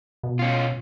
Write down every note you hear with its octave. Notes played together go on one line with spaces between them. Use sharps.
B2
C#4 F4